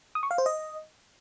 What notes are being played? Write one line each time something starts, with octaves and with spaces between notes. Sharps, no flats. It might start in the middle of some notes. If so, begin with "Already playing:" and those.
D#6
C#6
F5
C5
D#5